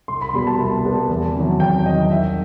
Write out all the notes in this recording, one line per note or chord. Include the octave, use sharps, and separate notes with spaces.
C2 C6
B5
C6
B2 G3 B3 B5
A5
C2
B2 G3 B3
E2
C3 D#3 F#3
E2 G5
C3 D#3 F#3 D#5
C2 E5